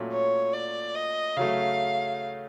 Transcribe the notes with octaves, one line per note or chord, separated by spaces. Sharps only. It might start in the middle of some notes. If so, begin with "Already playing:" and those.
Already playing: A#2 F#3 A3 C#4
C#5
D5
D#5
C#3 F#3 A3 F5